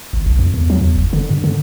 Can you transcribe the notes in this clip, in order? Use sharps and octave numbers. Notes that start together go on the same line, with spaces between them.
G#1
B1
F2
E2
F#3
E2
F1
D3
G2
D3